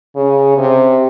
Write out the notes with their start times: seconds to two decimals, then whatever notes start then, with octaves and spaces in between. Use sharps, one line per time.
0.16 C#3
0.58 C3